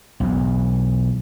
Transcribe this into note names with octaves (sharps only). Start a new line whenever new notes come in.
B1 E2